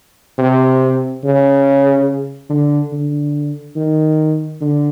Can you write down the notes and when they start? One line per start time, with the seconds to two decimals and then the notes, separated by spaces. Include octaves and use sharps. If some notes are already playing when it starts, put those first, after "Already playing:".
0.38 C3
1.24 C#3
2.49 D3
2.92 D3
3.76 D#3
4.60 D3